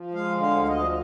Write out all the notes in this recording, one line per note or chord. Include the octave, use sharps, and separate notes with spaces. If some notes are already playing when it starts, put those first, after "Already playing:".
Already playing: F3
G#3 F5
D3
F5
D2
F5
D#5
F3